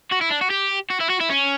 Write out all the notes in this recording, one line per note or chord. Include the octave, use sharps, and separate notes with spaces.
F#4
E4
D4
F#4
G4
F#4
E4
F#4
E4
C#4